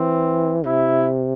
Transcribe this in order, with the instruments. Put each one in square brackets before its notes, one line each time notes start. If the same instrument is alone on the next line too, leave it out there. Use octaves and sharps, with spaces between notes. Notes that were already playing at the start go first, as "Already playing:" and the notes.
Already playing: [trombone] E3 [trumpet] C4
[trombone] C3 [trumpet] E4